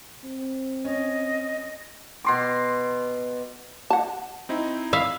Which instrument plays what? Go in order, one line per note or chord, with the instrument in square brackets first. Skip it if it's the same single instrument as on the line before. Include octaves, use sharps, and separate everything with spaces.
[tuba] C4
[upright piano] C#4 [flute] D#5
[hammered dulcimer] B2 C6 D6
[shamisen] F#5 A5
[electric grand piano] C4 D#4 E4
[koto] E5 F5 [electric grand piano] B5 F6